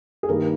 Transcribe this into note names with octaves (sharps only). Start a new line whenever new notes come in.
G#4
G2 D#3 G3 A#3 A#4